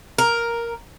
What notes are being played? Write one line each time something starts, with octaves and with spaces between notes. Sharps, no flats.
A#4